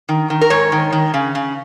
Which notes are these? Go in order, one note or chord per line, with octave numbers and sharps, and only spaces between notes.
D#3
D#3
A#4
G#2 C#5
D#3
D#3
C#3
C#3